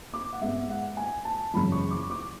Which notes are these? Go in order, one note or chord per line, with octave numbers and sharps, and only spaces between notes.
D6
F#5
G#2 G#3 B3 E5
F#5
G#5
A5
F#2 C#3 E3 B5
C#6
D6
D6